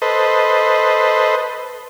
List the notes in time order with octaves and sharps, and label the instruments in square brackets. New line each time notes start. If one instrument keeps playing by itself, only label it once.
[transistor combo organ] A4 B4 C5 D#5